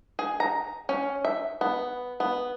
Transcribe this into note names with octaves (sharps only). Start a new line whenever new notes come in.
G#4
A#5
C#4
E5
B3
B3